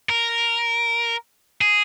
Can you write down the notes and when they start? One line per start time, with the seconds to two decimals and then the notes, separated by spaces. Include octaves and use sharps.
0.09 A#4
1.61 G#4